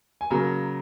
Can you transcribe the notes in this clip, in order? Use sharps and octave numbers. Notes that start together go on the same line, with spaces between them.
G#5
C#3 F#3 A#3 A#5